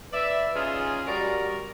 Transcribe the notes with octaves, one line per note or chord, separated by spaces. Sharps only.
B4 D5 E5
C#4 D#4 F4 G#4
G3 F#4 A#4 D5